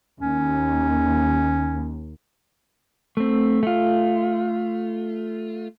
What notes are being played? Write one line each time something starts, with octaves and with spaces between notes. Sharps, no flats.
D#2 C#4
A3 C4
A3 F4